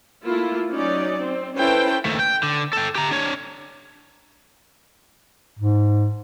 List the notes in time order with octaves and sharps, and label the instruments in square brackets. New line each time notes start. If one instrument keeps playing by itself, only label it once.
[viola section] A3 A#3 E4 F4
F#3 C#4 D#4 D5
C4
C#4 E4 A4 B4 C5 G5
[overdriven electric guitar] D#2 A3
G5
D3
A4 G5
G4 A#5
D4 C#5
[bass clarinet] G#2